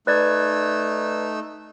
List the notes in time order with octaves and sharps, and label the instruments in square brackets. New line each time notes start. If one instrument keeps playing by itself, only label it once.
[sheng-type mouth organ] A3 D#4 E6 [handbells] B4 D5 G#6